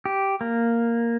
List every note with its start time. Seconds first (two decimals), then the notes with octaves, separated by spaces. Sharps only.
0.06 G4
0.41 A#3